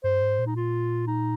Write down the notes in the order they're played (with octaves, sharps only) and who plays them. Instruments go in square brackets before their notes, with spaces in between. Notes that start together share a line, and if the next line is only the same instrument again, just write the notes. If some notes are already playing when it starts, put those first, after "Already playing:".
[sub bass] G2 [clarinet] C5
[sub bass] G#2
A#2
[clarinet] D#4
F4
D#4